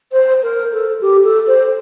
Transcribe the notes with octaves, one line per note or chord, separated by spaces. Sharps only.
C5
A#4
A4
G4
A4
C5